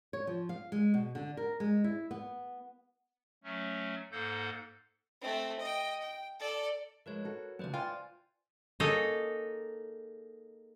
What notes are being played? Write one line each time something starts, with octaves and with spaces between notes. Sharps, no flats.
C#5
F3
F5
G#3
B2
D3
A#4
G#3
E4
B3
F#3 A3 C#4
G#2 A#3 A4 F#5 G6
A3 C4
D#5 G5
G5
A4 D5
F3 G#3 A#4 B4 C#5
F#4 A4
C#2 F#2 B4 C5 D5
F4 D5 G5 G#5 A6
A#3 D#4 G#4 A4 C#5 D#5